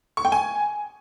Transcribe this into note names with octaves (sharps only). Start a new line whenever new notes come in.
C#6
G5
G#5